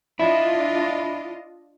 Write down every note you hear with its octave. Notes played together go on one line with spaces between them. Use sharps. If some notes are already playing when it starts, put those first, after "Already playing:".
D4 E4 F4 D#5